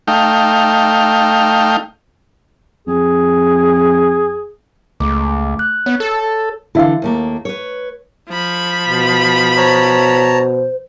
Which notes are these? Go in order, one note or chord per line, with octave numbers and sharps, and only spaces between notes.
A3 D#4 F5 G5
F2 G#4
C#2 A3 D6
F#6
B3 C#5
A4
D3 E3 E4 E5 F5
D#2 A3 A#3
B4 C#5
F3 B5
B2
C5 C#5 A5 A#5